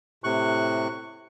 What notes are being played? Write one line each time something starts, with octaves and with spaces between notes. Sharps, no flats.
A2 C3 C#6 F#6